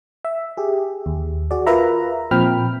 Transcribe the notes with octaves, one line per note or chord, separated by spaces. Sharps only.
E5
G4 G#4
D#2
F#4 G#4 D5
F4 A#4 B4 E5 A#5
A#2 F3 C4 G5 B5 F6